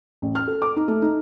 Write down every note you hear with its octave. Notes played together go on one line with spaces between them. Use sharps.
A1
F6
A4
D6
D#4
A3
D#4